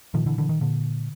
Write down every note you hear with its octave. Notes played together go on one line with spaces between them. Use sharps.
A#2 D#3 F3
D3 E3
D3 E3
D#3
A#2 D3